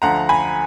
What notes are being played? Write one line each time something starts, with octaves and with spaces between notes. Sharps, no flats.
D2 D3 F3 F#5 A#5
G#5 B5